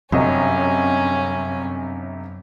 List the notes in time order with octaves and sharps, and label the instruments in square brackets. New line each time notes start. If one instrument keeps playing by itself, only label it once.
[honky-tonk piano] G1 C3 D#5 [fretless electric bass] F#2 [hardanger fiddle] C#4